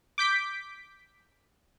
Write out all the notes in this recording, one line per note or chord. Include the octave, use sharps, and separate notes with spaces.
D6 G6 B6 D7